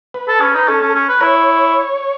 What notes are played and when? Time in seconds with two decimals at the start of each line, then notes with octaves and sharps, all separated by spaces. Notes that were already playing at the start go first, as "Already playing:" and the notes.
0.14 B4
0.28 A4
0.41 C#4
0.55 D#4
0.68 C#4 A4
0.82 C#4
0.95 C#4
1.09 B4
1.21 E4 C#5